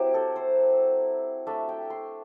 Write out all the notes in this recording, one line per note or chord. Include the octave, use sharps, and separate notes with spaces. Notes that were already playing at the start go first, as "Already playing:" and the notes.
Already playing: F#3 C4 E4 G4
A4
C5
A3 D4 E5
G5
C6